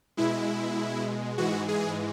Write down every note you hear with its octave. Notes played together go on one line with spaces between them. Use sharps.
B2 G#3 E4
G#2 E3 G#3 F#4
G#4